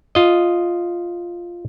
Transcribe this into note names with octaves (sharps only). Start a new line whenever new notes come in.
F4 D#5